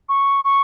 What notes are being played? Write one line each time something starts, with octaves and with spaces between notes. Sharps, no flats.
C#6
C#6